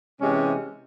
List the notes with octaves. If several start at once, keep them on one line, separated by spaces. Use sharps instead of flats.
C3 E3 G#3 C#4